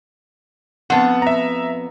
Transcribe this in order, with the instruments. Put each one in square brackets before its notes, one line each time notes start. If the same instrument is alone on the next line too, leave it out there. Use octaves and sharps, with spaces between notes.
[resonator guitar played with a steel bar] F2 B3 [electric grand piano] F#5 A5
[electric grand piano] E5 A#5